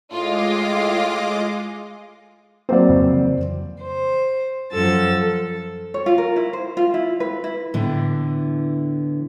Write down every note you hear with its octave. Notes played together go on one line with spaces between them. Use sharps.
A2 G#3 F4 D#5 F5 D6
F#3 A#3 C4 C5 D5
F2 C#3 E3
C5
F#2 F3 A4 E6 A6
A4
C#5
F4
A#4
E4
C5
F4
E4
B4
E4
A2 D3 E3 B3 E4